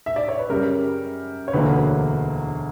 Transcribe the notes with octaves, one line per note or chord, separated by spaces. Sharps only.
E5
D5
C#5
B4
F#2 C#3 G3 A#4
C#5
E1 D2 D3 F#3 A#3 B4